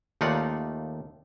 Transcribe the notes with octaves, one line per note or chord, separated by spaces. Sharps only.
D#2 A3 D#4 F4 D5 F#5